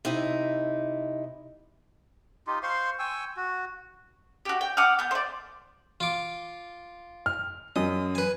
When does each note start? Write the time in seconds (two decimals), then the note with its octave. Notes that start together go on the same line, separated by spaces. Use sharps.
0.05 C3 D#4 E4
2.47 D#4 F4 G4
2.63 C5 F5 C6 C#6
2.99 G5 G#5 C#6 E6
3.37 F#4
4.45 F#4 G4
4.61 G5
4.77 F#5 D6 D#6 F6
4.99 B3 G6
5.11 C5 D5
6.00 F4 D6
7.26 F6
7.76 F#2 D#5
8.15 B4 G#5